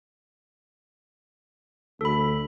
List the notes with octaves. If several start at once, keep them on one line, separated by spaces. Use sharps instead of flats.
D2 A4 B5